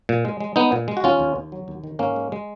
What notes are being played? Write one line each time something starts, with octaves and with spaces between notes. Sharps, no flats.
A#2
G#3
G#3
G#3 B3 D#4
A#2
G#3
F#4
D#2 C#4 F4
D#2
D#2
F#3
D#2
D#3
G#2 A#3 C#4
G#3
G#3